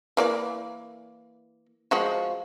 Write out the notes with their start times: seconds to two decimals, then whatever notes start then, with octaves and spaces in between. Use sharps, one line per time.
0.17 E3 A#3 D5
1.91 F3 G#3 F#4